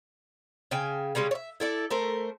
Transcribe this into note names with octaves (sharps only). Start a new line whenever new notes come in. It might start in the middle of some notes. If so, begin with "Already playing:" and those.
C#3 G5 G#5
C#3 G3 G#3 C#4
C#5 E5
E4 A4 D5
A3 A#4 C5